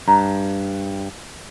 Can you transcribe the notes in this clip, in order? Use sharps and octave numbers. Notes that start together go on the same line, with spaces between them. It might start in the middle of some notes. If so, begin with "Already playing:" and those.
G2 A#5